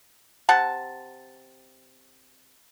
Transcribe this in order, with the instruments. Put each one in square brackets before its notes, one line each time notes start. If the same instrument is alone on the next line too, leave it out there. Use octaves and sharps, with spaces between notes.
[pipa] C3 F#5 A5